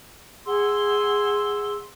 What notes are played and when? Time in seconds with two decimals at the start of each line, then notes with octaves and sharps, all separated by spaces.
0.46 G#4 F#5 C6 E6